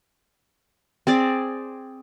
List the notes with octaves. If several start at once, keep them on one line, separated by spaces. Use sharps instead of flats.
C4 G#4 D5